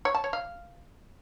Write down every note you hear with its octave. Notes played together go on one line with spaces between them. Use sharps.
C#5
A5
C#5
F5